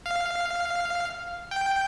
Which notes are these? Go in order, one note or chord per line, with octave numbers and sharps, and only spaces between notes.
F5
G5